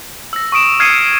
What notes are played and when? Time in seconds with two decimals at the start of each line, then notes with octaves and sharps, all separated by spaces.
0.33 E6 A#6
0.52 C#6 D#6 D7 E7
0.79 D#6 F6 G#6 C7 C#7 D#7